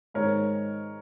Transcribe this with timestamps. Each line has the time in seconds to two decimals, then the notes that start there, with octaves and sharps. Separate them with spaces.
0.14 G#2 D#3 G#3 C4 A#4 C#5